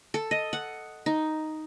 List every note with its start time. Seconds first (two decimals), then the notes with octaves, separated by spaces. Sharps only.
0.14 A4
0.31 D#5
0.53 F#5
1.06 D#4